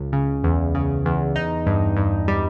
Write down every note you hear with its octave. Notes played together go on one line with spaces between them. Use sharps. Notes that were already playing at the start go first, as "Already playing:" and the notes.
Already playing: C#2
C#3
E2
C#3
E2
D#4
G2
G2
G3